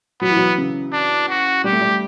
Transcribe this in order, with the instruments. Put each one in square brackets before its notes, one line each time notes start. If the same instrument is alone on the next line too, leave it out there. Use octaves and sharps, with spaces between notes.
[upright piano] F#3 [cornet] B3
[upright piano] E3
F#3
C#3
[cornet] D4
F#4
[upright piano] G3 [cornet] G4
[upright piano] A3
G3